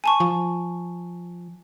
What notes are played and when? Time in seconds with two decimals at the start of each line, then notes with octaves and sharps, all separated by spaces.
0.04 G#5 A5 C#6
0.20 F3